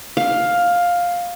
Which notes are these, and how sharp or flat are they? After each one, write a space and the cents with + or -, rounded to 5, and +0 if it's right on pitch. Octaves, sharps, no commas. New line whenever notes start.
F5 +10